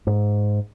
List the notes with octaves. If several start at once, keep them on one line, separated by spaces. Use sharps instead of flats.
G#2